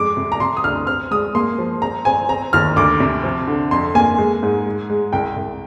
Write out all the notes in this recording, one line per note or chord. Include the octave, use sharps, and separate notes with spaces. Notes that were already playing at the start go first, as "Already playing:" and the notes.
Already playing: F2 G#3 D6
C3
A#5
C3 C6
D#6
D2 F6
C4 F6
G#3 D#6
A#3 C6
F3
C4 A#5
C4 G#5
C4 A#5
D#2 F6
D2 D6
C3
F3
D3
F2 C6
A#3 G#5
G#3
G#2
G#3
G#3
C2 G5
C2